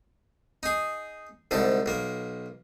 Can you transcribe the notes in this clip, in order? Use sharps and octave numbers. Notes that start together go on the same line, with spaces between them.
D#4 G#4
C2 G#2 D3 A4
B1 A#3